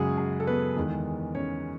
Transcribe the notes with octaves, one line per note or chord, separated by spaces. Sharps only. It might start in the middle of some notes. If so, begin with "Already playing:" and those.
Already playing: F#2 C#3 G#3 F#4 G#4 F#5
G#4
A4
B3 B4
E2 D#3 G#3
C#4 C#5